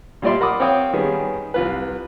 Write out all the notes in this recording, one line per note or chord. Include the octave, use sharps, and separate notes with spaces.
A#2 G3 F4 D5 E5 C6
A#4 F#5 B5 C6 D6 D#6
C4 C#5 F5 G5 D#6
D#3 G3 B3 C#4 G#4
C2 F4 B4